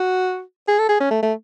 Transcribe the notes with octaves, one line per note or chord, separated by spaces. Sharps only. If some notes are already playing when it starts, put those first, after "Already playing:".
Already playing: F#4
G#4
A4
G#4
C#4
A3
A3